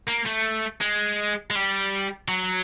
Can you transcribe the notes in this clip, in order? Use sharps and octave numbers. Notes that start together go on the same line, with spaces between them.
A#3
A3
G#3
G#3
G3
F#3